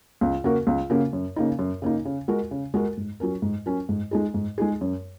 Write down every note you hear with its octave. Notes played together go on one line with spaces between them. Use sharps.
C#2
C#3 A#3 F#4 A#4
C#2
C#3 A#3 F#4 A#4
F#2
C#3 A#3 D#4
F#2
C#3 A#3 D#4
C#3
G#3 F#4 A#4
C#3
G#3 F#4 A#4
G#2
F#3 C#4 A#4
G#2
F#3 C#4 A#4
G#2
G#3 D#4 G#4
G#2
G#3 D#4 G#4
F#2